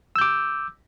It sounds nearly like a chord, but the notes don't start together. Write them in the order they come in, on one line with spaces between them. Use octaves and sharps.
E6 G6 D6